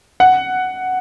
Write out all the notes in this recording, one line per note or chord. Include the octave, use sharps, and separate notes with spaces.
F#5